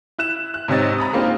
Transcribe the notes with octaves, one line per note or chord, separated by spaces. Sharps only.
E4 F#6 E7
F#6
G#2 C3 C4 C#5 D#5 A6
A#5 B5 D#6
G#3 A#3 C4 D4 D#4 F4